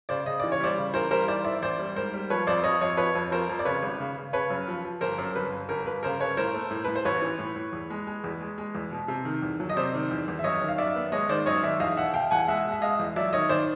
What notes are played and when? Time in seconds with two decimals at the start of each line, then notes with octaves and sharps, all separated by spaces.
0.09 C#3 C5 D5
0.26 C#3 D#5
0.40 E3 D5
0.52 C#5
0.60 G3 C5 D5
0.78 C#3
0.94 E3 A#4 C5
1.11 G3 A#4 C5
1.28 E3 C5 D5
1.45 E3 D5 E5
1.62 A1 C5 D5
1.79 G3
1.96 G#2 A#4 C5
2.14 G3
2.30 F3 B4 C#5
2.47 F2 C5 D5
2.63 F3 C#5 D#5
2.81 F2 C#5 D#5
2.97 F3 B4 C#5
3.15 F2
3.31 F3 A#4 C5
3.49 F2
3.59 D5
3.65 C#3 B4 C#5
3.83 G#1
4.00 C#3
4.17 C#3
4.33 C#3 B4 C#5
4.50 F#2
4.68 F3
4.85 F3
5.01 G1 A#4 C5
5.18 F#2
5.35 G1 B4
5.53 G1
5.69 G1 A#4
5.87 G1 B4
6.03 C#3 A#4 C5
6.20 G1 B4 C#5
6.37 A2 A#4 C5
6.54 A3
6.71 A2
6.84 A2 B4
6.95 C5
7.05 A1 B4 C#5
7.22 E3
7.39 A2
7.56 A2
7.73 E2
7.90 G#3
8.07 G#3
8.24 E2
8.41 G#3
8.58 G#3
8.75 E2
8.91 B2
9.08 C3
9.25 D#3
9.42 E2
9.60 F#3
9.69 D#5
9.76 C3 C5 D5
9.94 D#3
10.11 E2
10.28 E2
10.39 E5
10.44 F#2 C#5 D#5
10.61 D#3
10.68 F5
10.78 F#2 D5 E5
10.96 B3
11.12 G#3 C#5 D#5
11.29 D#3 C5 D5
11.46 F#2 C#5 D#5
11.63 D#3 D5 E5
11.80 E2 D#5 F5
11.97 B2 E5 F#5
12.14 B2 F5 G5
12.31 E2 F#5 G#5
12.48 G#3 E5 F#5
12.65 B2
12.72 E5
12.82 G#3 D#5 F5
12.99 E2
13.16 F#3 D5 E5
13.33 D#3 C#5 D#5
13.49 D#3 C5 D5